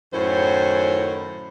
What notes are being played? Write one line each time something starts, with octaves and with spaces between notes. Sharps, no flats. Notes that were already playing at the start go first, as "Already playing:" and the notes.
F#2 A2 D#3 E4 C5 C#5